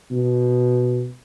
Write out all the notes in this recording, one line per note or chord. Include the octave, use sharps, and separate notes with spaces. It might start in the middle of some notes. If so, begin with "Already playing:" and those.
B2